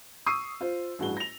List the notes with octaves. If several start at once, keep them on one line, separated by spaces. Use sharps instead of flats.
C#6 D#6 E6 C7 D#7
F4 C5
A1 G2 F#4 G#4 G7
A#6 F7